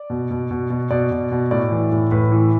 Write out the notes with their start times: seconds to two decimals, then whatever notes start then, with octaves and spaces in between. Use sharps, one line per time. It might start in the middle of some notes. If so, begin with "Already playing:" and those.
Already playing: D5
0.10 B2
0.31 B2
0.51 B2
0.70 B2
0.91 B2 D5
1.11 B2
1.31 B2
1.51 A2 D5
1.71 E3
1.92 A2
2.11 A2 B4
2.32 E3